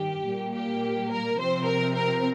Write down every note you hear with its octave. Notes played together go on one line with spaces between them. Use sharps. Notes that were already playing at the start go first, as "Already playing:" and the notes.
Already playing: G2 D#3 G4
A#2 G3 A#3
G4
A#4
C3 F3 C4 C5
A#4
A#4